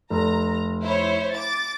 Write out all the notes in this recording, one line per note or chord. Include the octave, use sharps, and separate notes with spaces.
F1 A#5
E4 C5 C#5
D6 A6